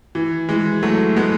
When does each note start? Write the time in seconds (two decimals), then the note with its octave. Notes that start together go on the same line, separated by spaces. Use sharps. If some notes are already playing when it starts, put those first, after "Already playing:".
0.15 E3
0.49 E3 G#3
0.83 F#3 A3
1.16 G#3 B3